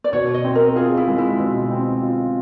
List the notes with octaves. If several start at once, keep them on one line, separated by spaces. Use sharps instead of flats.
D5
B2 C#5
D#5
C4
A#4
F4 G#4
E4
G#3
E4
B2
C4
F4